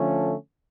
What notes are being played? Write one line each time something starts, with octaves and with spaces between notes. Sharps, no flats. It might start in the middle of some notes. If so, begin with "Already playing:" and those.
Already playing: D3 F3 A3 C#4